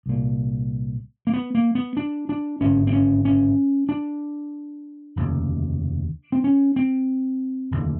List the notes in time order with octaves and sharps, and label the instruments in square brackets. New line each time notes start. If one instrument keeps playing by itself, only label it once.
[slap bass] C2 A#2
A#3
B3
A#3
B3
D4
D4
G#1 G2 D3 C#4
C4
C#4
C#4
D4
F1 D#2 C#3
C4
C#4
C4
F1 D#2 D3